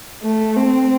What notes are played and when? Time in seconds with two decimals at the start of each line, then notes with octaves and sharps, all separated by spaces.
0.23 A3
0.56 C4